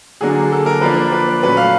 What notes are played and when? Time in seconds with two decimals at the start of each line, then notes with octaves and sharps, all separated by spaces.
0.21 D3 F#3 A#3 D4 G#4
0.52 A4
0.66 A#4
0.81 F3 A#3 D4 B4
1.12 B4
1.43 A#2 F#3 A3 C#4 B4
1.57 F5